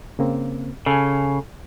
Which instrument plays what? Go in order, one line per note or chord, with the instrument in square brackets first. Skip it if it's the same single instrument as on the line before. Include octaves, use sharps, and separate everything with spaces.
[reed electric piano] C#3 A#3 C4
[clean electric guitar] C#3 [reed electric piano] A4 G#5